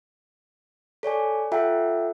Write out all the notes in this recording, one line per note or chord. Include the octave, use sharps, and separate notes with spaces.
A4 C#5 D5 G#5
F4 A4 E5 F#5 G5